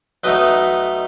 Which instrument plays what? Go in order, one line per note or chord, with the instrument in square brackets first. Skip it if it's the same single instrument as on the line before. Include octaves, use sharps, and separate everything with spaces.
[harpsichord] B1 B2 A3 D#4 B4 D#5